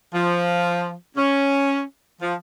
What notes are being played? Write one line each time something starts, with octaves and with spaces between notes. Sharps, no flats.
F3
C#4
F3